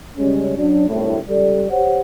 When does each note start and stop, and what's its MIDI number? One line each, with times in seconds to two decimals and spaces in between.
0.18 0.56 49
0.18 0.56 55
0.18 0.56 56
0.18 0.56 61
0.56 0.86 54
0.56 0.86 61
0.56 0.86 62
0.88 1.17 31
0.88 1.17 36
0.88 1.17 42
0.88 1.17 45
1.28 1.65 37
1.28 1.65 55
1.28 1.65 69
1.28 1.65 74
1.70 2.01 67
1.70 2.01 72
1.70 2.01 73
1.70 2.01 78